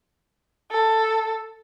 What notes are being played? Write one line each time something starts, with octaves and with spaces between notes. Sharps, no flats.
A4